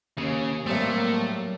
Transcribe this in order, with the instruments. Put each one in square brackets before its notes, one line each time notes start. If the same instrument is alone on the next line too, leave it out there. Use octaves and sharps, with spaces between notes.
[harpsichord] D#2 [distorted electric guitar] C#3 G#4
[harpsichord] A2 G3 C4 [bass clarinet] F#3 [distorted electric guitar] A3 [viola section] A#3